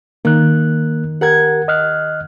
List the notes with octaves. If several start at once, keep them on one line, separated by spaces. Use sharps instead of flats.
D#3 A#3 F#6
G4 A#4 F#5 G#6
D#5 F6 F#6